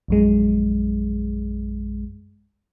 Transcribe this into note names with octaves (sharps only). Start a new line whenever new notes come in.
A#1 F#2 G#3